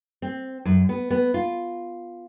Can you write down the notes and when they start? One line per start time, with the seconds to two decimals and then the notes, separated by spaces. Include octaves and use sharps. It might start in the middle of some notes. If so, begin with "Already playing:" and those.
0.22 C4
0.65 F#2
0.89 B3
1.11 B3
1.34 F4